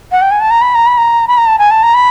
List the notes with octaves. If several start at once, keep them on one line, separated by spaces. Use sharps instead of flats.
F#5
G5
G#5
A5
A#5
B5
A#5
B5
A#5
B5
A#5
A5
G#5
A5
A#5
B5